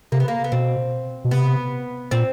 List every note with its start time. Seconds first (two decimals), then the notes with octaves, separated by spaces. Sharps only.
0.12 C3 A#3
0.20 B3
0.28 A#3
0.44 B3
0.52 B2 C4
1.25 B2
1.31 C3 B3
2.11 A#2 C4